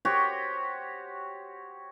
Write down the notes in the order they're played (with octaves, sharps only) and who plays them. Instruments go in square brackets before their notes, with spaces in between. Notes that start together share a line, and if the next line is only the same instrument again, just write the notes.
[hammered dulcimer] F#4 G4 C5 C#5